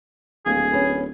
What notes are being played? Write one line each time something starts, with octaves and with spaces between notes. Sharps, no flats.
D1 D#2 G#4
B3 C#4